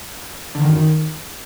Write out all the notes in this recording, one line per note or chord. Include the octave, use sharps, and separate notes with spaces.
D3
D#3
F#2
D#3